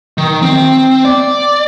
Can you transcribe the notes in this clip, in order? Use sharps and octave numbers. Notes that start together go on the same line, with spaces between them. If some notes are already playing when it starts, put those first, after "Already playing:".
D#3
C4
D5